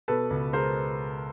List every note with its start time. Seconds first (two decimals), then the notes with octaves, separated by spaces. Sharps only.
0.08 B2 A4 B4
0.30 C#2
0.53 G#3 A#4 C5